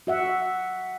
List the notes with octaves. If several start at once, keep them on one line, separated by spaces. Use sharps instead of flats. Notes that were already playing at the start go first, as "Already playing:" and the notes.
F#4 E5 F#5